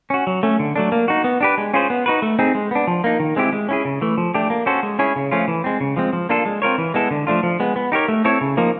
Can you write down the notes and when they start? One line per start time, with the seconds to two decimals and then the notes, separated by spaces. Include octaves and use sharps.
0.10 C#4 F#4
0.27 F#3
0.43 A3 C#4
0.59 D3
0.76 F#3 A3 D4
0.92 A#3
1.08 D#4 F#4
1.24 B3
1.41 D4 G4 B4
1.58 G#3
1.74 C#4 F4 G#4 C5
1.90 B3
2.06 D#4 F#4 B4
2.22 A3
2.39 C4 D#4 G#4
2.55 G#3
2.71 B3 D4
2.87 F3
3.04 A#3 D#4
3.20 D#3
3.36 G#3 C4 E4 G4
3.53 G#3
3.69 C#4 E4 G#4
3.85 C#3
4.01 E3 A3
4.18 F3
4.34 A3 D4 G4
4.50 A#3
4.66 C#4 F#4 A4 C5
4.83 G#3
4.99 C#4 E4 G#4 C#5
5.16 C#3
5.31 F3 A3 C#4 F4
5.48 E3
5.64 G#3 C4
5.80 C#3
5.97 F3 G#3 C4
6.13 F3
6.29 A#3 D4 F4 A4
6.46 G#3
6.62 C4 F4 A#4 C#5
6.78 E3
6.94 G#3 B3 E4 A4
7.11 D3
7.27 F3 A3 D4 F4
7.43 F3
7.60 G#3 B3
7.76 B3
7.92 D#4 G4 A#4 C#5
8.08 A3
8.25 C4 E4 A4 C#5
8.41 C#3
8.57 F3 A#3 D#4